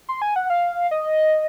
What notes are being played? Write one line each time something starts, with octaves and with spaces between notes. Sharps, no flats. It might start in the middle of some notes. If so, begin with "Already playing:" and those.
C6
G#5
F#5
F5
D#5